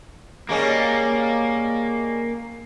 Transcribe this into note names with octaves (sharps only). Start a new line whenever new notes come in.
G3 G#3 A#3 C#4